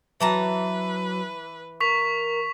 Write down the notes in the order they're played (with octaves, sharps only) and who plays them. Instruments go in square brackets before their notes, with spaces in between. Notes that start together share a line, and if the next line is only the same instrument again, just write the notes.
[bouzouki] E3 A5 A#5 [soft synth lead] F#3 [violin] B4
[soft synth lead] A#4 [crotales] C#6 B6 F7